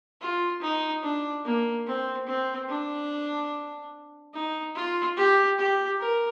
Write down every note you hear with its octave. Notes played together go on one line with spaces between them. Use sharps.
F4
D#4
D4
A#3
C4
C4
D4
D#4
F4
G4
G4
A#4